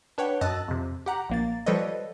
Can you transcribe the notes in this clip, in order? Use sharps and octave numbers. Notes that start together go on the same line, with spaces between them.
D4 B4 C#5 F#5 G5
F#2 D#5 A5 E6 F#6 A6
F2 C3
G4 F#5 A#5
A#1 A#3 A6
F3 G3 A4 B4 C#5 D#5